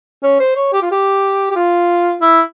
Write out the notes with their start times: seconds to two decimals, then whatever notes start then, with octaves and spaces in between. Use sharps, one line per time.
0.23 C#4
0.40 C5
0.56 C#5
0.73 G4
0.82 F4
0.91 G4
1.51 G4
1.56 F4
2.21 E4